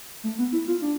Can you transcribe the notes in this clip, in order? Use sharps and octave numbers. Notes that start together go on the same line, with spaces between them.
A3
B3
E4
F4
D4